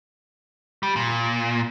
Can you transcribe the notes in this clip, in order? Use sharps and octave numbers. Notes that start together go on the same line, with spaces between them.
G3
A#2